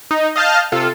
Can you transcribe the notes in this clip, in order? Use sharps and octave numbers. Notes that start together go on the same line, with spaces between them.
D#4
D#5 F5 A5 F6 G6
C3 F4 A4